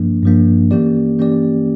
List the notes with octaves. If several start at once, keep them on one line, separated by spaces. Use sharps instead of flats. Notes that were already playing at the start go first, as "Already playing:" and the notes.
Already playing: G2 F3 A#3 D4
G2 F3 A#3 D4
E3 A#3 C#4 G4 D5
E3 A#3 C#4 G4 D5